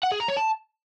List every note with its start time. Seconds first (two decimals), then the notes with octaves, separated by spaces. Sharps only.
0.03 F#5
0.12 G#4
0.20 A#5
0.28 C#5
0.37 A5